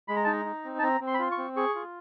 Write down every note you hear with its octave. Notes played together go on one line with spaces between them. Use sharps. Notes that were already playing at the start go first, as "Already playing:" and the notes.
G#3 B5
A#5
D#4 A5
A#5
D#4
C4
A5
C4 A#5
C4
C6
B5
F4 C6
C#6
C4
G#4 C#6
F4